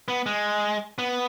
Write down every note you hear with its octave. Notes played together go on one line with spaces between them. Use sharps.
B3
G#3
B3